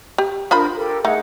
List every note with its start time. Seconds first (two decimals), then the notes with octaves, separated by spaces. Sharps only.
0.18 G4
0.51 D4 F4 A#4 C5 B5
0.76 G4 A4 A#4
1.05 A3 D#4 G#4 F#5